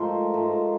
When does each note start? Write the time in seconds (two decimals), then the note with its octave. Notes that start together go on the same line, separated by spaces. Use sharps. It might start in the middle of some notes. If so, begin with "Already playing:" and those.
Already playing: G#2 F3 A3 A#4 C5
0.34 G#2 F3 A3